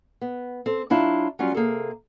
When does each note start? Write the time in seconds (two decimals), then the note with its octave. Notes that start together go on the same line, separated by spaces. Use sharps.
0.21 B3
0.66 C4 A4
0.90 F#3 D4 E4 F4 F5
1.39 F#3 G3 C#4 F4
1.55 C3 A#3 G#4 A4